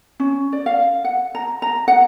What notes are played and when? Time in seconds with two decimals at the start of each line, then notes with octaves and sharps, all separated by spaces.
0.20 C#4
0.53 D5
0.66 F5
1.04 F#5
1.35 A#5
1.62 A#5
1.88 F#5